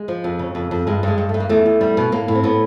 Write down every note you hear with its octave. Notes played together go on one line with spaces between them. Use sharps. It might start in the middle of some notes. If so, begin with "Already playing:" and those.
Already playing: G#3
F3
F2
C#3
F2
F2
G2 G#3
G2 G#3
G2
A3
G2
A#3
E2 A3
E2
G3
B2
A2 A#3
A2
C4
A2 B3